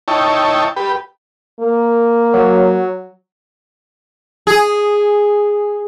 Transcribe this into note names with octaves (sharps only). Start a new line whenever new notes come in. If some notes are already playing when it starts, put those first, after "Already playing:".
D#4 E4 C#5 G5 A5
G4 B4
A#3
F#3
G#4